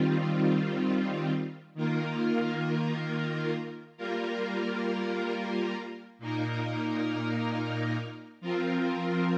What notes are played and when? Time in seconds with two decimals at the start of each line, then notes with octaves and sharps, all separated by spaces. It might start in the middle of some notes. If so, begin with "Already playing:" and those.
Already playing: D#3 G3 C4 F4
1.75 D#3 A#3 F4 A#4
3.97 G3 A#3 F4 A#4
6.19 A#2 A#3 D#4 A#4
8.41 F3 C4 F4 A#4